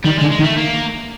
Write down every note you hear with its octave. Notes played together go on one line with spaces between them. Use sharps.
D#3 G3
D3 G#3
G#3
D#3
A3
A#3